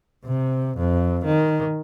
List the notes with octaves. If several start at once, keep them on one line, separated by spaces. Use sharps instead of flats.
C3
F2
D#3